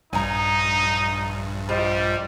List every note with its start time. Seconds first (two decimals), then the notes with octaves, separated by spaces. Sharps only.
0.13 A#1 G2 D#4 G#5 A#5
1.69 G3 F4 C5 D#5